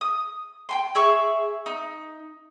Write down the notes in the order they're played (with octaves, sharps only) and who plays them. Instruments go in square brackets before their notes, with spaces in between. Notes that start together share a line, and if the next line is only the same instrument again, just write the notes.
[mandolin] D#6
G5 G#5 C6
G#4 E5 C#6
D#4